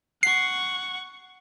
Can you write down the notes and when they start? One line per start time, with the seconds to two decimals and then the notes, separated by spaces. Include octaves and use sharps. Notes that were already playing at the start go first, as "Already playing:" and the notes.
0.23 F#5 C#6 C7